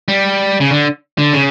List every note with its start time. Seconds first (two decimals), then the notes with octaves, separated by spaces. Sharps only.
0.08 G3
0.60 C#3
0.71 D3
1.18 D3
1.33 C#3